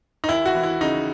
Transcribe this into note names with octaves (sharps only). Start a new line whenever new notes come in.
D#4
D#2 E4
F#4
E3
E4
C#3 D#4